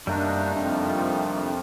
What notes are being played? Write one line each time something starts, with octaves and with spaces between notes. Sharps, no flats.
F#2 C3 D#3 G3 A3 A#3 D4 D#4
F2 D4